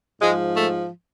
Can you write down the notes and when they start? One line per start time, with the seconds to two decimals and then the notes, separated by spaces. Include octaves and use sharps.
0.20 G#2 F3 G#3
0.55 A3